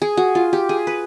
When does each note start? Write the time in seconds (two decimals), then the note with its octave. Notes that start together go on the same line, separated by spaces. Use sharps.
0.02 G#4
0.17 F#4
0.35 F4
0.53 G4
0.69 G#4
0.87 B4